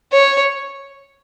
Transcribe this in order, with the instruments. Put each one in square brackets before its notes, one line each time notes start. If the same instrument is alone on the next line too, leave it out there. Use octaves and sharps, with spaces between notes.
[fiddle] C#5